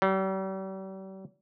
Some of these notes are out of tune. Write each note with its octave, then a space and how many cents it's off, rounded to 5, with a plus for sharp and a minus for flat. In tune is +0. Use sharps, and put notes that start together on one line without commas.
G3 -40